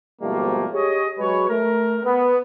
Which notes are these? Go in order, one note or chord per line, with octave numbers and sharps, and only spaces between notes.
G#2 B2 F3 G3 A3 A#3
G4 G#4 C#5 D#5
F#3 G#3 B4 C#5
A3 A#4
B3